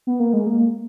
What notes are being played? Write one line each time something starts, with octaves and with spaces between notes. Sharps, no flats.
B3
A#3
G#3
A#3